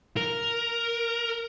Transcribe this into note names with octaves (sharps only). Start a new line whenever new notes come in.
A#4